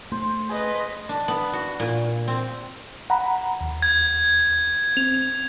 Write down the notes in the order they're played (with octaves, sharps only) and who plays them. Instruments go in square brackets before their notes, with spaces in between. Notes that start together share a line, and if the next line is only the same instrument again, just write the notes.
[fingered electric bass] A3 [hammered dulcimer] C5
[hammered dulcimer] G#4 [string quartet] B4 D#5
[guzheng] D4
B3
F#4
A#2
C4
[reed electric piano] F#5 A#5 B5
D#2
[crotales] G#6
[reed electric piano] C4 [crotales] F7